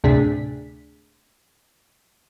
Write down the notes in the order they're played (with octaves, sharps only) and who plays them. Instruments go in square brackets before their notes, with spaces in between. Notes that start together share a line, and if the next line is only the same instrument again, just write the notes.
[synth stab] D2 A2 C3 D4 G#4 B6